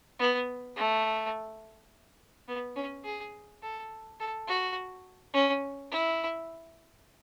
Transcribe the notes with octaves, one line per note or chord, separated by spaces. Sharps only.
B3
A3
B3
C#4
G#4
A4
A4
F#4
C#4
E4